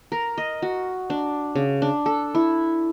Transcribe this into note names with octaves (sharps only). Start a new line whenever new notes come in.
A#4
D#5
F#4
D4
C#3
D4
A4
E4